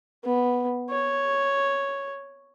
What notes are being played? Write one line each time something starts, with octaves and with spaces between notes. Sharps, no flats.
B3
C#5